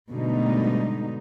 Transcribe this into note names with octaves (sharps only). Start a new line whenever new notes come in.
G#2 B2 D3 G3 A3 D#4